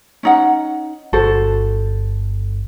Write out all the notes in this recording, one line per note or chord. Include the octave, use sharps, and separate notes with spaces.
C#4 D#4 F#5
G1 F#4 A4 C5